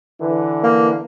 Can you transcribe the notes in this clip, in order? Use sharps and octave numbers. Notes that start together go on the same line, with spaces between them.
D3 E3
A#3